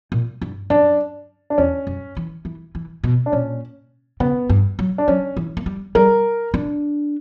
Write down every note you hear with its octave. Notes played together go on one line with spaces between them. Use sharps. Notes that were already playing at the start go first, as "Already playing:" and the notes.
A#2
G2
F#2 D4
D4
E2 C#4
F#2
E3
E3
E3
B2
D4
A#2 C#4
C#3 B3
G2
F#3
D4
F#3 C#4
E3
A#3
G3
G3 A#4
D4